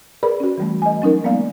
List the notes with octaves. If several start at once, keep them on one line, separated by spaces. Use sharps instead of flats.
G#4 A#4 B4 D5 B5
C#4 F#4
E3 G3 A3
D#5 G#5
F#3 C#4 D#4 A#4
F#3 G#3 A#3 B3 D5 F5